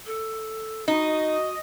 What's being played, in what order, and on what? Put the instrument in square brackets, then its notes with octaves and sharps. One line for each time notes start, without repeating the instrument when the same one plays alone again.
[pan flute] A4
[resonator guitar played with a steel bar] D#4 [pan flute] F#4 [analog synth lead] D#5